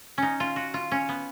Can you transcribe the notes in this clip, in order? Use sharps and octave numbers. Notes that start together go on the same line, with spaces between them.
C#4 D#4
F4
F#4
F4
C#4
B3